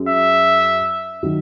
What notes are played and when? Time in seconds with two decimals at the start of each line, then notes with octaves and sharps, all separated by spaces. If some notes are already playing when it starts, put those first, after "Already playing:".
Already playing: F#2 G#3
0.09 E5
1.23 D#3 F#3